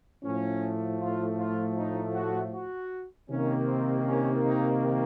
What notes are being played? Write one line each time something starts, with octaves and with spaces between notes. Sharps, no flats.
A2 F3 A3 C#4
F4
F4
D#4
F#4
F#4
C3 D#3 A#3 C#4
C4
C#4
D#4